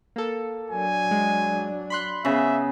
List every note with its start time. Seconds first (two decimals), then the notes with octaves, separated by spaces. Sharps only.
0.16 A#3 A4
0.71 F#3 D4 G#5
1.11 G#3
1.90 B5 C6 F#6
2.25 C#3 B3 E5